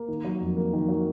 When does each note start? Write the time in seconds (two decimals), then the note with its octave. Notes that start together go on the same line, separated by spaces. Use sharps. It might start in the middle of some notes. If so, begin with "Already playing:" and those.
Already playing: A#3
0.08 D#3
0.25 F#3
0.41 F2
0.56 A#3
0.73 D#3
0.89 F#3